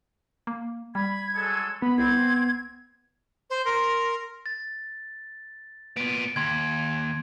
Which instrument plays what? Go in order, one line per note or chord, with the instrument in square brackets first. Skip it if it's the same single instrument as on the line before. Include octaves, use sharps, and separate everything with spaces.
[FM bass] A#3
[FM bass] G3 [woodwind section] B5 [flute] G#6
[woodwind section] F#3 G#3 A4
[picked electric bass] B3 [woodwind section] B5
[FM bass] C2 [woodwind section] C4 [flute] G#6
[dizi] C5
[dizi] A#4 [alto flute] C6
[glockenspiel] A6
[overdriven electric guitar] A#2 B3 [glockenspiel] D7
[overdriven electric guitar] D#2 [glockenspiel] C6 G#6